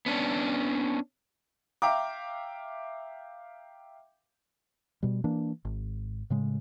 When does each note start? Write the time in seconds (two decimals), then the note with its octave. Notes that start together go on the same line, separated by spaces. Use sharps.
0.06 B3 C#4 D4
1.82 E5 F5 G5 A#5 D6
5.03 B2 G3
5.24 E3 A#3 D4
5.65 G#1
6.30 A2 C#3 G#3